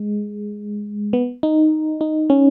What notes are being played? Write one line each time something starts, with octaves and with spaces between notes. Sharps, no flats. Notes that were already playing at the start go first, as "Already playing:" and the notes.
Already playing: G#3
B3
D#4
D#4
C#4